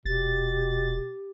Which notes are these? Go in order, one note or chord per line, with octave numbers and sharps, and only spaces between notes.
D#1 B2 G4 A6